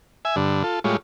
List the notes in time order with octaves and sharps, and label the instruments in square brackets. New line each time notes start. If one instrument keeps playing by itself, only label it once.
[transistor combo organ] E5 G#5
G2 D3
F4 A4
A2 G3 G#3 F4 C#5